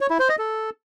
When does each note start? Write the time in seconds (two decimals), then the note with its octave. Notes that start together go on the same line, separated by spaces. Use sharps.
0.01 C#5
0.10 E4
0.20 C5
0.29 D#5
0.39 A4